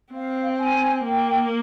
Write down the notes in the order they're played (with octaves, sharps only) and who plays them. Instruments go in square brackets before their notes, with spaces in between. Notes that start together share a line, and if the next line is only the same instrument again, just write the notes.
[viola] C4 [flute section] F5
[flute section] G#5
[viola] A#3 [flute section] G5